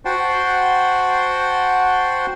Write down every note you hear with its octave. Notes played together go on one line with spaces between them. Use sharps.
F#4 C5 F#5 G5 A5 C6